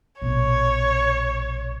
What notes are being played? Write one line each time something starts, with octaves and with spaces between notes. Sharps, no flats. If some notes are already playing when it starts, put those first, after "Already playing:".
A#1 B2 C#5